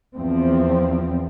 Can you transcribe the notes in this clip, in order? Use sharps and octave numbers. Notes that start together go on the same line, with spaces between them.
E2 F3 C4